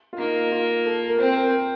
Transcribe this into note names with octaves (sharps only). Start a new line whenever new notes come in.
F4
A#3 D#4
F4
A4
A#4
C4 C5
A#4